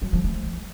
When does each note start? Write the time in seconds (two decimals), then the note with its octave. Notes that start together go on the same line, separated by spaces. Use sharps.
0.02 F#3
0.13 F3
0.24 A3